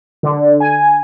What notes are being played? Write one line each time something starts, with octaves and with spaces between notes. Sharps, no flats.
D3
G#5